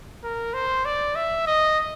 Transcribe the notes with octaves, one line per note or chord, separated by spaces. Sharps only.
A#4
C5
D5
E5
D#5